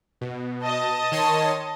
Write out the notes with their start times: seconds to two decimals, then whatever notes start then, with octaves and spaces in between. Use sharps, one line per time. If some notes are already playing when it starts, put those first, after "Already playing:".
0.21 B2
0.63 D#5 A5
1.12 D#3 C#5 C6